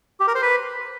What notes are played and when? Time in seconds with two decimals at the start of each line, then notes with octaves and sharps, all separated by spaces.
0.20 G4
0.27 A#4
0.35 C5
0.42 B4